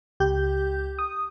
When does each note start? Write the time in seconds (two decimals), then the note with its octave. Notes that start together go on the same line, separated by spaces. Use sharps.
0.20 C#2 G4 G6
0.99 D#6